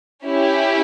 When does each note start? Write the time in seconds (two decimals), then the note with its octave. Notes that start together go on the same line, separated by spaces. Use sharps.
0.24 C#4 E4 G4